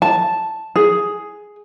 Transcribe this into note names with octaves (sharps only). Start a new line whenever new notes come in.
A5
G#4